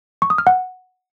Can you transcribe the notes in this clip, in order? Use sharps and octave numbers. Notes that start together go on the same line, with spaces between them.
C#6
D#6
F6
F#5